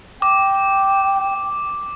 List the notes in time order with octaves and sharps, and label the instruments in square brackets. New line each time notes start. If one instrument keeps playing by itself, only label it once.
[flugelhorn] G5 [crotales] D6